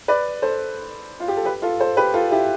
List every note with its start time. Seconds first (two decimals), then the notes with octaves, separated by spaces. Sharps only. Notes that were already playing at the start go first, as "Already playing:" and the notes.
0.08 B4 D5
0.42 A4 C5
1.20 F4
1.28 G4
1.37 A4
1.45 G4 B4
1.62 F4 A4
1.80 A4 C5
1.97 G4 B4
2.14 F4 A4
2.31 E4 G4